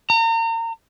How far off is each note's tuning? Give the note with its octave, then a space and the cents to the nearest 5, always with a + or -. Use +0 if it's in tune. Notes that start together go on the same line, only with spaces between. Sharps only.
A#5 -35